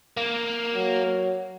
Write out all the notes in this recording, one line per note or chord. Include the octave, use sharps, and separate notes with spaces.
A#3
F#3